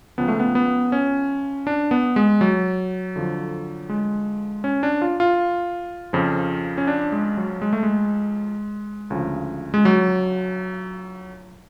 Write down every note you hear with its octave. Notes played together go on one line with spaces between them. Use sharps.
C#2 C#3 F3 B3
A3
B3
B3
C#4
D4
B3
G#3
F#3
F2 D3 F3
G#3
C#4
D4
F4
F4
F2 C#3 F3
C#4
D4
G#3
F#3
G#3
A3
G#3
D2 C#3 F3
G#3
F#3